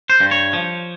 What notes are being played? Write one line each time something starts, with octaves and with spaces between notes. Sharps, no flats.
C5
G2
C#5
F3